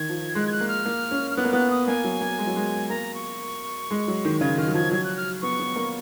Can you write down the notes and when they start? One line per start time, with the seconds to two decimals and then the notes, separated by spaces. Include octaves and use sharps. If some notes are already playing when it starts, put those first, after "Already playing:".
Already playing: D#3 G#6
0.09 F3
0.35 G#3 F#6
0.47 G#6
0.52 F#6
0.61 A#3
0.69 F6
0.85 A#3
1.11 C#4
1.31 F6
1.37 B3 F#6
1.45 A#3
1.53 B3 F#6
1.70 D#6
1.87 A#3 G#5
2.04 F#3
2.21 A#3
2.39 G#3
2.47 F#3
2.56 G#3
2.89 A#3 A#5
3.15 C#6
3.91 G#3
4.08 F#3
4.25 D#3
4.41 C#3 G#6
4.58 D#3 F6
4.68 F#3
4.74 F3 G#6
4.91 F#3 G#6
5.04 F#6
5.17 F6
5.42 B3 C#6
5.59 B3
5.76 A#3